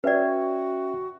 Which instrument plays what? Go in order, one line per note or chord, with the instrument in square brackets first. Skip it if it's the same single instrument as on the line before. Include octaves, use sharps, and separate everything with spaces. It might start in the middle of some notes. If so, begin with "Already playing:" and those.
[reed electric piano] C#4 E5 G5 [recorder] F#4 [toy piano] B4 D5